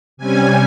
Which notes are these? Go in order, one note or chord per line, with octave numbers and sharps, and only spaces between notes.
C3 G3 C#4 G#5